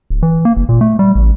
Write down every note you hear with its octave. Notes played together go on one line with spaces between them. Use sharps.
D1
E3
A#3
F#1
A#2
A3
G3
A1